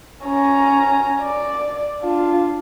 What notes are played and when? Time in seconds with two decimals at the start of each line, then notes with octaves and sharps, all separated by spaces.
0.24 C#4 A#5
1.21 D5
2.02 D4 F4